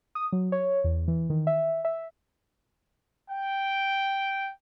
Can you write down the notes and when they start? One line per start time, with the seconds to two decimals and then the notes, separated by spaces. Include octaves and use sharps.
0.15 D#6
0.32 F#3
0.52 C#5
0.84 E2
1.08 E3
1.30 D#3
1.47 E5
1.85 E5
3.30 G5